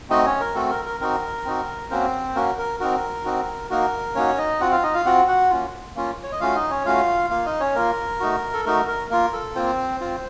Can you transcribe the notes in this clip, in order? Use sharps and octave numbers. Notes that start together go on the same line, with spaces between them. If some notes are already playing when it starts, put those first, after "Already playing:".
A3 C4 D#4 F#4 D#5
C#4 C#5
A#4
A3 C4 F#4 A4
A#4
A#4
C4 D#4 F#4 A#4
C4 D#4 F#4
A#3 C4 C#4 F#4 C5
A#3 C#4 F#4 A#4
A#4
C4 D#4 F#4 A#4
C4 D#4 F#4
A#3 D#4 F#4 A#4
A#3 C#4 D#4 F#4 C#5
D#4 D#5
C4 F4 F#4 F#5
F4 F5
D#4 D#5
F4 F5
C4 F4 F#4 F#5
F#4 F#5
A#3 C#4 F4
A#3 C#4 F4
C#5
D#5
A3 C#4 F4 F#4 F5
D#4 D#5
C#4 C#5
A3 C#4 F4 F#4 F5
A#3 F4 F5
D#4 D#5
C#4 C#5
A#3 F4 A#4
A3 D#4 F#4
A4
A3 D#4 F#4 A#4
A#4
A#3 F4 A#4
A4
A#3 C4 F4 C5
C4 F4